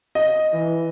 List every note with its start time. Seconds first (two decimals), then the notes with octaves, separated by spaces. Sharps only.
0.15 D#5
0.53 E3